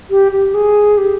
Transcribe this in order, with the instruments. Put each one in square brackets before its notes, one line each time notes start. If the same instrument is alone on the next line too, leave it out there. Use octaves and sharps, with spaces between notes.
[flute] G4
G4
G#4
G4